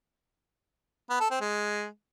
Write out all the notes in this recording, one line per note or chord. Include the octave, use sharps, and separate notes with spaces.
B3
A4
C4
G#3